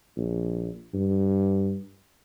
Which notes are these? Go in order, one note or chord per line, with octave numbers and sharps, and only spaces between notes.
A#1
G2